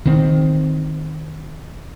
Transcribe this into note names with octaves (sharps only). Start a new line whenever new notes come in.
D#3 C4